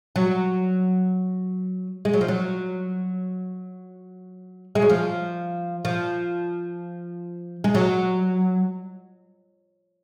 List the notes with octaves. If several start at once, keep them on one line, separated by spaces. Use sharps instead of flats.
F#3
G#3
F#3
F3
F#3
G#3
F#3
F3
F3
G#3
F#3